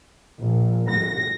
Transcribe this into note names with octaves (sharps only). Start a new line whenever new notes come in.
A#1
A#6